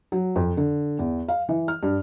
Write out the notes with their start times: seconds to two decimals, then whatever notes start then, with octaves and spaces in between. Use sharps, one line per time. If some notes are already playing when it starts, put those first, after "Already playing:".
0.12 F#3
0.36 F2
0.57 D3
0.99 E2
1.28 F5
1.49 E3
1.68 F6
1.83 G2